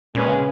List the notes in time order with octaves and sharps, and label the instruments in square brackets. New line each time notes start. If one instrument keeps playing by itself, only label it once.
[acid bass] A#2 [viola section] G#3 C#4 G#4 B4
[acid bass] C#3